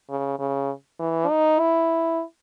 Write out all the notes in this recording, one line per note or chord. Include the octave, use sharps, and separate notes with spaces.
C#3
C#3
E3
D#4
E4